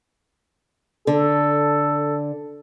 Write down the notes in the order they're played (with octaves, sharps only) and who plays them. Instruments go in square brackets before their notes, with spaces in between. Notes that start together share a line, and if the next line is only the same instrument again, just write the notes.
[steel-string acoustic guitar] D3 [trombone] A4